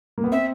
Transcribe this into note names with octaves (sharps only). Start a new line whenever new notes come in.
A#3
B3
C4 E5